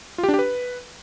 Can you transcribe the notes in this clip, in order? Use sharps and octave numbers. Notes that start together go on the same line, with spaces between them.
F4
G4
D4
G4
B4